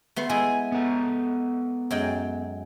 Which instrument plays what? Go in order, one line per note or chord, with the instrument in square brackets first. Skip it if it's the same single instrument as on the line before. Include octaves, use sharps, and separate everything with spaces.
[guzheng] A3 B3 C6
[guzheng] G#3 E4 G#4 [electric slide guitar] G#5
[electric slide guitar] B3 A4
[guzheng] F#2 G#3 G5